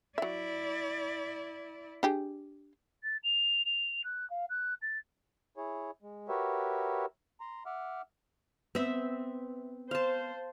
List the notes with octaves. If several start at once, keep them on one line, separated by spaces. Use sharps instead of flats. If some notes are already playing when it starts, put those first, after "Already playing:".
F#3 E4 D5 E5
D4 G4 G#4
A6
F7
F7
F#6
F5
F#6
A6
E4 G#4 C#5
G#3
F#4 G4 A#4 B4 C#5 E5
A#5 C6
E5 F#5 D6 F6
B3 C4 E5
C5 F5 A5